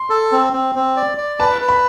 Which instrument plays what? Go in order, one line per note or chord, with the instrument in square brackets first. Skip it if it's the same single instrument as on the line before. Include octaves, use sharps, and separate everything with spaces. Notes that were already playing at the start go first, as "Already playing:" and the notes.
Already playing: [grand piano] C6
[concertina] A4
C4
C4
C4
D5
D5
[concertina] B4 [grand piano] A5
[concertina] B4
[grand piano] B5